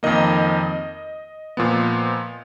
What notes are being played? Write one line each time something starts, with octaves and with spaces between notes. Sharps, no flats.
F2 D#3 A#3 D#5
A#2 F3 B3